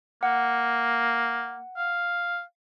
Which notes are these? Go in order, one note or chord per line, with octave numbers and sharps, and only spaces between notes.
A#3 F#5
F5